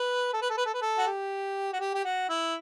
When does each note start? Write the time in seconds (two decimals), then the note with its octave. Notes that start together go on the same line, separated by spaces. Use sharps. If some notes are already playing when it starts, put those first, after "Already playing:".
Already playing: B4
0.33 A4
0.42 B4
0.50 A4
0.57 B4
0.66 A4
0.74 B4
0.82 A4
0.98 F#4
1.07 G4
1.73 F#4
1.80 G4
1.94 G4
2.05 F#4
2.29 E4